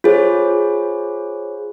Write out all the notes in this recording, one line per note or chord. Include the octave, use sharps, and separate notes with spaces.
F4 G#4 C5 C#5